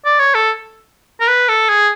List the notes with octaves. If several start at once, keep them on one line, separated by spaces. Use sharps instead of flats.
D5
C#5
A4
A#4
B4
A4
G#4